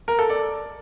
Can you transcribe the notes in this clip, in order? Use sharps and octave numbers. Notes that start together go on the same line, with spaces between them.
A#4
A4
D5